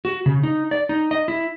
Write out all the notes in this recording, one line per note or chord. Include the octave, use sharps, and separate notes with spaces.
F#4
C#3
D#4
D5
D#4
D#5
E4